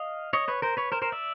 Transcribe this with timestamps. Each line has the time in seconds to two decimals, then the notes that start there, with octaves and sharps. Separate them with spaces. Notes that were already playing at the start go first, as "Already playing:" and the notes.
Already playing: D#5 F5
0.33 C#5 D#5
0.48 B4 C#5
0.62 A#4 C5
0.77 B4 C#5
0.92 A#4 C5
1.02 A#4 C5
1.12 D5 E5